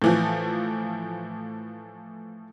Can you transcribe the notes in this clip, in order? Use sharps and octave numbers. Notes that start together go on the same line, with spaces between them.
A2 E3 F3